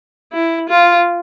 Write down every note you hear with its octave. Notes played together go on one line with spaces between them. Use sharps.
E4
F4